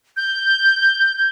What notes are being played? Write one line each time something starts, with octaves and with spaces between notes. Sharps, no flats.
G6